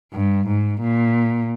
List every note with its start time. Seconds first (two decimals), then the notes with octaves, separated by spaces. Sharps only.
0.13 G2
0.48 G#2
0.81 A#2